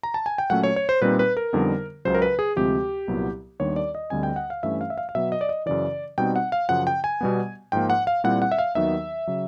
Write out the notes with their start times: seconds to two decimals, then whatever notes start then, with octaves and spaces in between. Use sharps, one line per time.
0.03 A#5
0.14 A5
0.26 G#5
0.38 G5
0.50 A#2 F#3 A3 C#4 F#5
0.63 C#5
0.76 C#5
0.89 C5
1.02 A#2 G3 C4 D#4 B4
1.19 B4
1.37 A#4
1.53 F2 D3 G3 B3 D#4
2.05 C#2 C#3 F#3 C5
2.15 A#4
2.22 B4
2.39 G#4
2.56 D2 C3 F3 G#3 C4 G4
3.08 C2 A#2 F#3 B3 E4
3.60 D#2 D#3 G3 B3 D4 C#5
3.76 D5
3.95 D#5
4.10 D2 D3 G3 C4 G#5
4.23 G5
4.36 F#5
4.50 F5
4.63 G2 E3 A3 C#4 E5
4.81 F5
4.90 E5
4.98 F5
5.09 F5
5.15 B2 F#3 B3 E5
5.32 D#5
5.41 D5
5.49 D#5
5.66 F#2 C#3 E3 D5
6.18 B2 G3 C4 D#4 G5
6.36 F#5
6.52 F5
6.69 F#2 C#3 F3 F#5
6.87 G5
7.04 G#5
7.21 B2 G3 B3
7.72 G#2 F3 A#3 G5
7.90 F#5
8.07 F5
8.24 A#2 G3 C4 E4 F#5
8.42 F#5
8.52 E5
8.58 F5
8.75 D#2 D#3 F#3 B3 D#4 E5
9.27 C#3 F#3